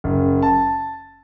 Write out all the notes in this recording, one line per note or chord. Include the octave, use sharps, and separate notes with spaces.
F#1
A5